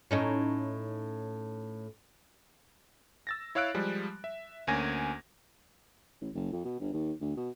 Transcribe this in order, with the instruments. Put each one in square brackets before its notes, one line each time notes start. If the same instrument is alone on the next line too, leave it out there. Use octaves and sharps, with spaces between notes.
[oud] A2 C#4 D#4
[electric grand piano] E6 A6 A#6
E4 C#5 F5 E6 F#6 D7
F3 G3 G#3
E5
D2 A#3 C#4 G#5 G#6 A#6
[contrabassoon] A1
F#1
F2
B2
G1
D#2
D2
B2